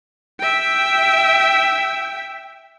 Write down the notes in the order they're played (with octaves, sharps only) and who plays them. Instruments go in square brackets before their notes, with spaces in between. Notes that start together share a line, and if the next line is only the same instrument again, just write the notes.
[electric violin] E5 G5